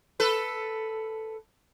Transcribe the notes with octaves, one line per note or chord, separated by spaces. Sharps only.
A4 B4